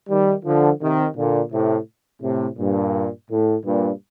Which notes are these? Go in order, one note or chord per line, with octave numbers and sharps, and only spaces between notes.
D#3 G3
D3 F3
C3 D#3
A#2 D3
A2 C3
A2 C3
G2 A#2
A2
G2 A#2